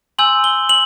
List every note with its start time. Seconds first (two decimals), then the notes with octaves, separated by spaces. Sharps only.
0.19 G#5 C6 E6 G6 F#7
0.44 G7
0.69 F#7